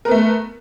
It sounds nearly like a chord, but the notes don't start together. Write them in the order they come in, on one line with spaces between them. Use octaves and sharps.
A#4 B3 A3